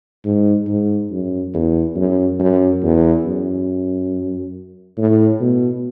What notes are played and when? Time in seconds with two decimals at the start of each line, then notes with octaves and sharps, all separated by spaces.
0.25 G#2
0.68 G#2
1.11 F#2
1.54 E2
1.96 F#2
2.39 F#2
2.83 E2
3.26 F#2
4.98 A2
5.40 B2